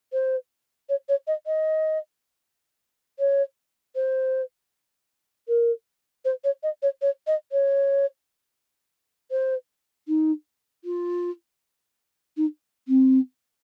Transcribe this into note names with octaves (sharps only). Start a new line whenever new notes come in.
C5
C#5
C#5
D#5
D#5
C#5
C5
A#4
C5
C#5
D#5
C#5
C#5
D#5
C#5
C5
D#4
F4
D#4
C4